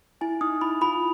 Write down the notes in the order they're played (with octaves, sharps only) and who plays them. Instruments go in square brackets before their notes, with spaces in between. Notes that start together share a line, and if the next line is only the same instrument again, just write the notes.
[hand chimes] E4 [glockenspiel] G#5
[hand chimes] D#4 [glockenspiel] D#6
[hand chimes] E4 [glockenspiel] B5
[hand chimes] F4 [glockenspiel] B5